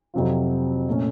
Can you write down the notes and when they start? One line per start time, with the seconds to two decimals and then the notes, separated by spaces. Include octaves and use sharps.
0.14 F2 C3 F#3 C4 F4
0.89 A#2 A3 C#4